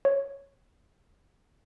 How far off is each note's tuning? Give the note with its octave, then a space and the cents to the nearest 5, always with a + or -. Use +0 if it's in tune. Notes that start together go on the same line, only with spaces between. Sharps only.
C#5 +0